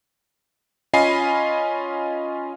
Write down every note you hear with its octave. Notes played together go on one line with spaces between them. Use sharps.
C#4 F4 D#5 G#5 B5 C7